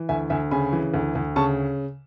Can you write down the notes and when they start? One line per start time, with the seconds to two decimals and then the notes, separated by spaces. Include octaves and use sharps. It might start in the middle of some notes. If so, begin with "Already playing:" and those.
Already playing: E3
0.09 D2 E5 G#5
0.30 D2 E5 G#5
0.51 C#3 G#5 B5
0.73 E3
0.94 D2
1.15 D2
1.36 C#3 A5 C#6